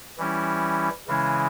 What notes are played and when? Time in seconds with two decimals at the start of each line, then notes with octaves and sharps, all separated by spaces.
0.18 E3 G3 C#4 E4
1.08 C#3 E3 G#3 C#4 E4